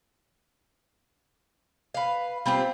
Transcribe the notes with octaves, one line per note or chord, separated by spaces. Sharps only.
B4 F5
G3 C4 F4 G4